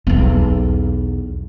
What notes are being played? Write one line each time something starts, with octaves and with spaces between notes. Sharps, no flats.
B1 E2